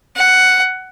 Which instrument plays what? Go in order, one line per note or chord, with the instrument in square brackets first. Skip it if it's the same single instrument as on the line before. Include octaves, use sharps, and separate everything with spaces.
[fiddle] F#5